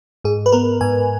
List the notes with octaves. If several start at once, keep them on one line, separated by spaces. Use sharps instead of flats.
G#2 G#4
B4
B3 A#4
G#2 G#5